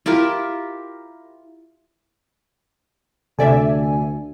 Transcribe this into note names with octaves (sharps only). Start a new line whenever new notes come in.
E4 F4 G4 A#4
D2 C3 A4 D5 E5 G#5